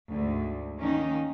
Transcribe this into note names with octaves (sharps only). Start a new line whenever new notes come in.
D2 G#2
D#3 A#3 C#4 D#4